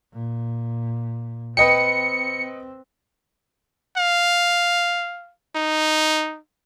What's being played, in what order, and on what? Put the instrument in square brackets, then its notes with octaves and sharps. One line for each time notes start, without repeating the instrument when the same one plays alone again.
[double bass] A#2
[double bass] C4 [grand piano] B4 D#5 G5 [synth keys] C#7
[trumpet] F5
D#4